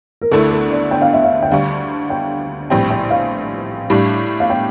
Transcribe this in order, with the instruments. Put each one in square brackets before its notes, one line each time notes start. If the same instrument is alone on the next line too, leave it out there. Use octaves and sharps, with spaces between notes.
[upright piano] A#4
[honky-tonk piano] D2 D3 A3 E4 [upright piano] A4
[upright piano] A4
D5
G5
F5
E5
F5
G5
[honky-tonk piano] D2 D3 G3 [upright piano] F5
[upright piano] G5
[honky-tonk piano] A#1 A2 G3 C4 [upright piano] G5
[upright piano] G5
F5
[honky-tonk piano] A2 G3 D4
[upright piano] F5
G5